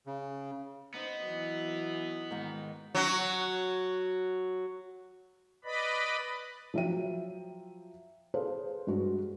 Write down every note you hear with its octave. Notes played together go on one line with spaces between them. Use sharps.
C#3
B3 D#4 C5 D#5
E3 F#3
G#2 D#3
F#3 F#4
B4 D5 D#5 B5
F3 F#3 E5 G5 D#7
G#4 A4 B4 C5 F5
G2 G#3 F#4